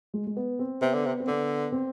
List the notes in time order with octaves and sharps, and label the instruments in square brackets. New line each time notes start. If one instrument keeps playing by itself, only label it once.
[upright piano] G#3
G#3
B3
C4
[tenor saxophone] C3 [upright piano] B3
[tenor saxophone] D3
C3
[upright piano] C4
[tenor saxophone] D3 [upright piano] B3
[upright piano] C4